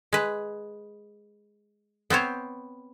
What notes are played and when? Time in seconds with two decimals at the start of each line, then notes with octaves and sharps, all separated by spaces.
0.13 G#3 B4
2.10 B3 C4 C5 C#5